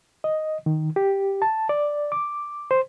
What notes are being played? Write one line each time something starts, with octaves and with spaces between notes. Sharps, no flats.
D#5
D#3
G4
A5
D5
D6
C5